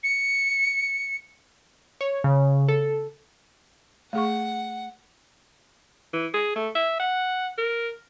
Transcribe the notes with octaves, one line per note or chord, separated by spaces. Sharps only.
C#7
C#5
C#3
A4
A3 G#4 F#5 C#6
E3
G#4
A3
E5
F#5
A#4